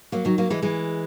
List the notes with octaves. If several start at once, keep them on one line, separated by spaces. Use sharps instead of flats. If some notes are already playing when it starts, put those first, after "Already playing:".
F#3 A#3
D#3 F#3
F#3 A#3
E3 G#3
E3 G#3